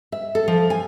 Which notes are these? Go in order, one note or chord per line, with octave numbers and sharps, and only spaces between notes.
E5
A4
F3
G#5